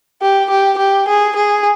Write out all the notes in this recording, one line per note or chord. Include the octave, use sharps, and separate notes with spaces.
G4
G4
G4
G#4
G#4